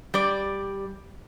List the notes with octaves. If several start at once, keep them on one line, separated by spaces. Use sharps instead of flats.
G3 D5